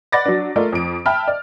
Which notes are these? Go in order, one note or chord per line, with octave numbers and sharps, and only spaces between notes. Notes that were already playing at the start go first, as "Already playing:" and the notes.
D5 F#5 B5 D6 A6 A#6
F#3 D4
A3 F4 A#4 D5
F2 D7
E5 G5 A5 B5 F6
D5